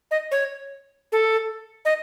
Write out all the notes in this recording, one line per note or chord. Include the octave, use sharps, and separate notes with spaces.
D#5
C#5
A4
D#5